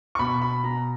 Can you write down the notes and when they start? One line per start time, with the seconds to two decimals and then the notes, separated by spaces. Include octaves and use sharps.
0.15 C#6
0.19 B2 B5
0.42 B5
0.64 B2 A#5